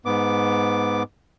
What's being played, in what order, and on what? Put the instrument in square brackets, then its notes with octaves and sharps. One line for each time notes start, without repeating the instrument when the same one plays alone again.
[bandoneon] G#2 B3 D6